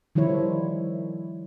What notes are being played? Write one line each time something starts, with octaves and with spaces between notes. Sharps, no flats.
D#3 F3 G3 E4 C#5